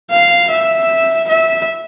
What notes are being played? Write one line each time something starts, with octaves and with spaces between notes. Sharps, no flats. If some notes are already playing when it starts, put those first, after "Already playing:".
F5
E5
E5